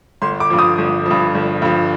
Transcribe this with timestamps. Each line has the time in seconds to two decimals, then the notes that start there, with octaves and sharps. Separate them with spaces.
0.22 G1 C6
0.40 D6
0.50 G2 F3
0.59 D#6
0.78 G1
1.05 F3
1.11 G2
1.35 G1
1.62 G2 F3